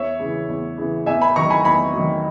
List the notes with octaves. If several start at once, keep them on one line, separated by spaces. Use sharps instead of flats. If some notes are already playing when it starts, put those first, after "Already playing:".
Already playing: E2 C#5 E5
C#3 E3
E2
C#3 E3
E2 E5 G#5
G#5 B5
D#3 F#3 A#5 C#6
G#5 B5
E2 G#5 B5
D#3 F#3